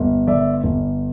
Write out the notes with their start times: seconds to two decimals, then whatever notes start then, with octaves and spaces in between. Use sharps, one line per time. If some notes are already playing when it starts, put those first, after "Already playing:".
Already playing: G1 G2
0.27 D3 D5 E5
0.63 G1